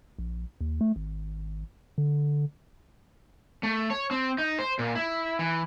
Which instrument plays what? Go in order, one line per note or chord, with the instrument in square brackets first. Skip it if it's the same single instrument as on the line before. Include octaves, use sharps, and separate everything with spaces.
[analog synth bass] A#1
D#2
A3
G#1
D3
[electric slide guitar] A3
C#5
C4
D#4
C5
A#2
E4
E3